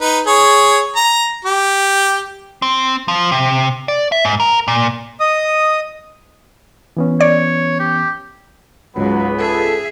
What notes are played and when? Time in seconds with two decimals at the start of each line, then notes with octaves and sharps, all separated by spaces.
0.01 D#4 B4
0.26 G#4 C#5
0.96 A#5
1.45 G4
2.62 C4
3.08 F3
3.31 C3
3.88 D5
4.12 E5
4.25 G#2
4.40 A#4
4.68 A#2
5.20 D#5 D#6
6.97 E3 B3 C#4
7.21 C#5 D5
7.80 G4
8.96 C#2 G#2 F#3 B3 B5
9.39 G#4 A4 E5